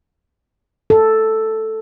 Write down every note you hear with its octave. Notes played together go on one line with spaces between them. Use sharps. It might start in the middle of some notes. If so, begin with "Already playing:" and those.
A4